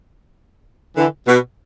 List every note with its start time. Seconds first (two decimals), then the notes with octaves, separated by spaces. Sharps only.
0.97 D3 E3
1.28 B2